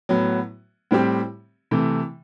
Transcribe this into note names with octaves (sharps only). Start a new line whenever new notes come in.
A2 F#3 B3
A2 G3 C4 G4
C3 E3 A3